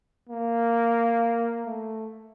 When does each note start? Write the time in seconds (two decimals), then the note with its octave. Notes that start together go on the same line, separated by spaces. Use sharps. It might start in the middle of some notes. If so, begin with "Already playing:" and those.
0.29 A#3
1.65 A3